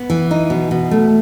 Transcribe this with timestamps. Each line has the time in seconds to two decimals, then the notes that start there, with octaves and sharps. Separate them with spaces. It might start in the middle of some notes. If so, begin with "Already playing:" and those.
Already playing: B3
0.10 E3
0.31 D#4
0.50 B2
0.71 B2
0.91 A3